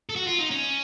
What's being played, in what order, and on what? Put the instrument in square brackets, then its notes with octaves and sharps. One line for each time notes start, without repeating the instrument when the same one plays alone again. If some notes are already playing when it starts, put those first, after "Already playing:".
[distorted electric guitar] A4
F#4
F4
D#4
C#4